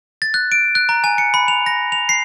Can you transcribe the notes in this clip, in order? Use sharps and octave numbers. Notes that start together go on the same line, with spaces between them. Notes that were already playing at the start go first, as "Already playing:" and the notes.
A6
F#6
D7
F#6
A#5
G#5
C#7
B5
F7
A#6
F7
C7